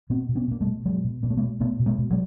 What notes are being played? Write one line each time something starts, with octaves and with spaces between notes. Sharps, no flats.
B2 A#3 C4
B2
B3 C#4
B2 A#3
G3 A3
B2
B2 F#3 G#3
B2
B2 A#3
A3
G#3 A#3
B2
B2 A3 B3
B2
G#3 A#3
B2
F#3 G#3